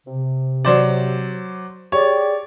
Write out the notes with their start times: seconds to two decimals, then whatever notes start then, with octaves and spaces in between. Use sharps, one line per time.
0.06 C3
0.65 F#3 C5 D5
1.92 G4 G#4 C#5 D5